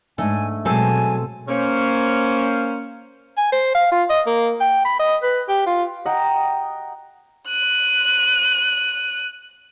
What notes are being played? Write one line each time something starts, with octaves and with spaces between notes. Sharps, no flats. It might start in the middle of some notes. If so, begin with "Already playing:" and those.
G#2 A3 D4 D#4 G#5
B2 F#3 G#3 C4 A4 G#5 A5
A#3 C#4 C5
G#5
C5
F5
F4
D#5
A#3
G5
B5
D#5
B4
G4
F4
D#5 F#5 G5 A#5
F#6 D#7